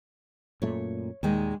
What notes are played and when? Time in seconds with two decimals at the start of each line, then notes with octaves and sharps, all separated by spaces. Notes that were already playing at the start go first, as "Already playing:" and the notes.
0.62 F#2 A#2 A3 C#5
1.23 D#2 A#2 D#3 G#3